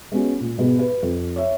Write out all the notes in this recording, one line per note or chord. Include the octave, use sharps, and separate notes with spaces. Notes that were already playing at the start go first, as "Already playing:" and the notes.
G#3 B3 C#4 F#4
A#2
G#2 B2 G#3 B3
B4
F2
C#5 E5